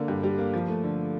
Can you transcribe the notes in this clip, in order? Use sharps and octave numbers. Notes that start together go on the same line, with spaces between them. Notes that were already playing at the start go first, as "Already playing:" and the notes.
Already playing: D3 A#3
G2
G3
A#3
F3
A3
D3